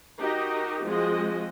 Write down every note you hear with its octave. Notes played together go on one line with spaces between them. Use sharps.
D#4 F#4 G4 A#4 D#5
F3 G#3 C4 F#4 D#5